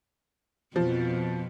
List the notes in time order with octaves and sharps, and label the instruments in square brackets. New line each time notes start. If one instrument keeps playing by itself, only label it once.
[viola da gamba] F2 B2 [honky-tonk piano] F3